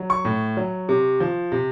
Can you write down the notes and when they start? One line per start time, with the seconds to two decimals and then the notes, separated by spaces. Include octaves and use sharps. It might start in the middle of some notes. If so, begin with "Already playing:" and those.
Already playing: F#3
0.10 C#6
0.25 A2
0.57 F#3
0.89 C3
1.20 F3
1.52 C3